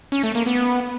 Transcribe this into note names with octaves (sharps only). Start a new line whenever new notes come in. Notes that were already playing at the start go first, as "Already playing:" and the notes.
C#4
A3
A#3
B3